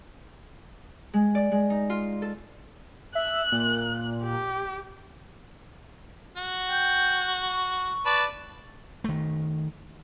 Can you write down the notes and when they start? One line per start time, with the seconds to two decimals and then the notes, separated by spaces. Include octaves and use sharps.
1.14 G#3
1.35 D5
1.52 G#3
1.70 D#4
1.90 F4
2.22 A4
3.15 E5 F#6
3.52 A#2
4.23 G4
6.37 F#4
6.69 G5
7.49 C#6
8.06 B4 D5 A5
9.04 D#3 A3